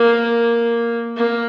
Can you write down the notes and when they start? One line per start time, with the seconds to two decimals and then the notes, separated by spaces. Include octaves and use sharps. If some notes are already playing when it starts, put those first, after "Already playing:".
Already playing: A#3
1.17 A#3